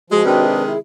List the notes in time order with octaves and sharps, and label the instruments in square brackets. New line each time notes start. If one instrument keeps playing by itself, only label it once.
[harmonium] F3 [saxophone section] G#3 [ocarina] F#4
[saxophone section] C3 D#3 G#3 [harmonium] C4 D4 B4
[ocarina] G#4
[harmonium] E4